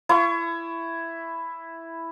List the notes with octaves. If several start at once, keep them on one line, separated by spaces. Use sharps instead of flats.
E4 C#6